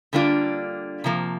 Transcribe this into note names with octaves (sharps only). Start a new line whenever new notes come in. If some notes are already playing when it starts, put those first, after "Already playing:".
D3 G3 A#3 D4 F4
C3 F3 A#3